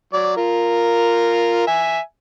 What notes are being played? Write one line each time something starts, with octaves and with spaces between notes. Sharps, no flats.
F#3 D5
F4 A#4
E5 G#5